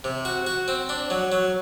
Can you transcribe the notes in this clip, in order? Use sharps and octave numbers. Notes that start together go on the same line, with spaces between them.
C3
F#4
F#4
C4
D4
F#3
F#3